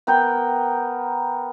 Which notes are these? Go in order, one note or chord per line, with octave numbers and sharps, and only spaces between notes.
B3 A#4 G5